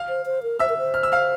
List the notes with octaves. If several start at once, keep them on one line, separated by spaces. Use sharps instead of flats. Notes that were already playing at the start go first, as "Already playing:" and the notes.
Already playing: F5 F6
C5
C5
A#4
C5 E5 E6
A#4
C5
F6
E6
F5 F6